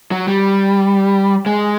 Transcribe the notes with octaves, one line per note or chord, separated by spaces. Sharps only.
F#3
G3
G#3